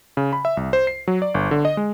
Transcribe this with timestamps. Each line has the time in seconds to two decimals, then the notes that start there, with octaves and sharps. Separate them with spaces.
0.17 C#3
0.33 B5
0.45 E5
0.57 C2
0.73 C5
0.87 C7
1.08 F#3
1.22 D5
1.34 G1
1.51 D3
1.65 D#5
1.77 G#3